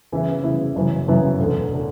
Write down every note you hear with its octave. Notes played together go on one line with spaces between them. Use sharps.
C#3 E3 B3 E4
C#3 E3 B3 E4
F#1 F#2 E3 B3 E4
F#1 F#2 E3 B3 E4
E1 D2 D3
D3